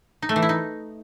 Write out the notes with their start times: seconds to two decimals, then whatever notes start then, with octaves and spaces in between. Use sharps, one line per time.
0.22 D#4
0.29 A3
0.36 E3
0.42 E4
0.49 D#4